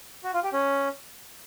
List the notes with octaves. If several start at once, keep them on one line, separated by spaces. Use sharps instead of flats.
F#4
F4
G4
C#4